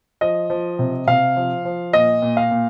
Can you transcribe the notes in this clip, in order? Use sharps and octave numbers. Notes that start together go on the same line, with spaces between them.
F3 D#5
F3
C3
C3 F5
F3
F3
A#2 D#5
A#2
F5
A#2